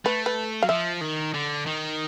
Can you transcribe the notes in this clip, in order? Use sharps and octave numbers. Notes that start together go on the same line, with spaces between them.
A3 B4
B4
F#3 F5
F3 E5
D#3
D3
D#3